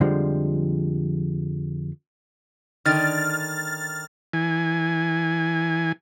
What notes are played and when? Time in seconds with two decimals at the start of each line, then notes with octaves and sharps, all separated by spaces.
0.01 F2 D3 F3 G3 G#3
2.86 D3 D#3 F6 A6
4.33 E3 G#5